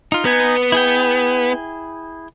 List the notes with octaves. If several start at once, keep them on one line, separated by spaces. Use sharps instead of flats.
D#4 F4
B3 D#4 G#5
E4 G#4 G5